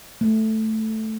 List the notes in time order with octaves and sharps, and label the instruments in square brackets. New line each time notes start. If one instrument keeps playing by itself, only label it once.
[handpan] A3